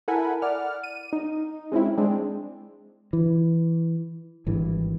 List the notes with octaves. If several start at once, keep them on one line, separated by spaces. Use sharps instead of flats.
E4 A4 A#4 F#5 G#5 B5
D5 F#5 F6
D#7
D#4
G#3 C4 C#4 E4
G#3 C4 D4
E3
G#1 G2 E3